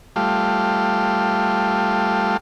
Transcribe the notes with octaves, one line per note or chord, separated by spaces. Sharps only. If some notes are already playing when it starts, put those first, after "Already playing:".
G3 A3 F4